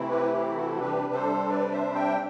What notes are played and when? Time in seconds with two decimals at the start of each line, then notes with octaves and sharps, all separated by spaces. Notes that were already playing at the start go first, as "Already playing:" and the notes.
Already playing: C3 E3 A3 C4 E4
0.09 G4 B4
0.32 G4
0.56 F#4 A4
0.79 C3 G3 D4 G4 B4
1.13 A4 C5
1.49 B4 D5
1.72 C5 E5
1.95 E5 G5